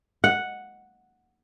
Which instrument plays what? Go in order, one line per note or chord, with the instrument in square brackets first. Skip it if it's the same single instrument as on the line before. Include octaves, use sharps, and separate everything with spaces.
[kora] F#5